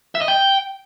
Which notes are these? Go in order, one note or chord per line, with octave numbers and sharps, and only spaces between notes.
E5
D#5
G5